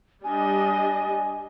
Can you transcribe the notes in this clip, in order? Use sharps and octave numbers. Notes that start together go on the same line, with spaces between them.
G3 D4 D#5 G#5